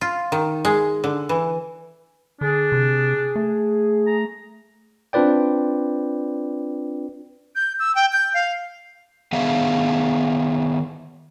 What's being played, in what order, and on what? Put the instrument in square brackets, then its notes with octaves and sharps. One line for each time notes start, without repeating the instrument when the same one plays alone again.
[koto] F4
D#3
G#3
D3
E3
[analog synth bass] D3 [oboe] D4 [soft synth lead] G#4
[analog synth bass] C3
A3
[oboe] A#5
[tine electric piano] C4 D4 F4 B4 D5 G5
[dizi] G6
E6
G5
G6
F5
[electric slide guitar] D#3 B3 G#4 E5 F5